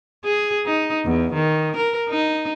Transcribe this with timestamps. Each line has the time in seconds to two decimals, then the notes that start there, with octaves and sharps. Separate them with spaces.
0.25 G#4
0.66 D#4
1.05 E2
1.34 D#3
1.76 A#4
2.09 D#4